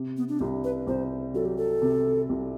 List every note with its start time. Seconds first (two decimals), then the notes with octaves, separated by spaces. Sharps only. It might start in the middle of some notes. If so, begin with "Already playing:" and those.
Already playing: C3
0.17 B3
0.29 D4
0.39 C2 C4
0.64 B4
0.87 C2 C5
1.34 F#3 A4
1.45 G4
1.57 A4
1.82 C3
2.29 C2